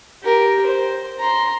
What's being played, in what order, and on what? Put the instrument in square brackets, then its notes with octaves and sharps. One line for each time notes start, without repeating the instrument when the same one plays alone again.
[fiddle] G4 A#4
C5
A#5 C6